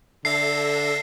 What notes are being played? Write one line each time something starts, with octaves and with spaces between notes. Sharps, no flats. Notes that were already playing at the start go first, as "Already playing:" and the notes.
D3 A4 E5 A#6 C7